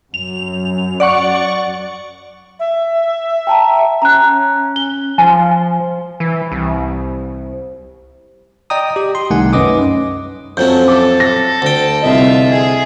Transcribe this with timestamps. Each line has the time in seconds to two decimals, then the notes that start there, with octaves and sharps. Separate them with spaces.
0.14 F#2 F7
1.00 D5 F#5 C#6
2.60 E5
3.47 G5 A5 A#5
4.02 C#4 A#5 F#6
4.76 G7
5.18 F3 G#5
6.20 E3
6.52 C2
8.70 D5 D#5 G5 A#5 D#6
8.96 G4
9.15 C6
9.30 C2 D#3 A3 D#4 F#5 G#5
9.53 F#2 C#4 B4 D#5 D6 D#6
10.57 F2 F#3 A3 C#4 G6
10.88 A4 D6
11.20 A#6
11.62 D2 G5
12.03 C2 F4 D#5 E5
12.50 G#4